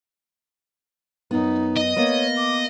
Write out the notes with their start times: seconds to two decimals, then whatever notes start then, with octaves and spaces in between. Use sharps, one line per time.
1.31 F#2 B3 D#4
1.77 D#5
1.96 A#3 B3 C#5
2.36 D6